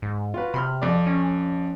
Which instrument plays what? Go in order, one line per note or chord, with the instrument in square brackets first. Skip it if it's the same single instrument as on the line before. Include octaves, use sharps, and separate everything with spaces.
[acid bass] G#2
[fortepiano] F4 F#4 B4
[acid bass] C3 [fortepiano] B5 C6 F6
[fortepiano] F2 D5
[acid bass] C#4